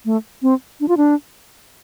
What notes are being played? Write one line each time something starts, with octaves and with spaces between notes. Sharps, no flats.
A3
C4
D4
F4
D4